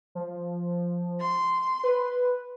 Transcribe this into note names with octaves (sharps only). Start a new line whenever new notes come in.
F3
C6
B4